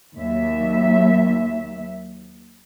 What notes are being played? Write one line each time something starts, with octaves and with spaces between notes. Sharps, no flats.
D#2 F#3 E5